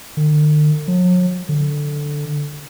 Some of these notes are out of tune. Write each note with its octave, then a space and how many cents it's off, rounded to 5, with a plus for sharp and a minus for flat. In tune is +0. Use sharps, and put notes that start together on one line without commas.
D3 +45
F#3 -40
D3 +0